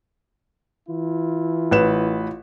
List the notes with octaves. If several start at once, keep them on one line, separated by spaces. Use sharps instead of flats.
E3 E4 F4
A1 B4 E7